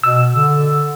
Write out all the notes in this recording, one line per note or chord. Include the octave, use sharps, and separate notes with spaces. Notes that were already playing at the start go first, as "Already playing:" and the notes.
B2 E6
D3